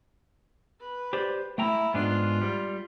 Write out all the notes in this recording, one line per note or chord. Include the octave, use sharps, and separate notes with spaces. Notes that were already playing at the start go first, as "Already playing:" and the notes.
B4
G4 C5 D5
A3 E4 G5 A#5
G#2 B3 D4 F4
G3